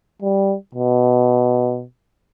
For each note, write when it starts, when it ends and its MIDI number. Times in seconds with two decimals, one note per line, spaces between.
0.22 0.55 55
0.75 1.84 47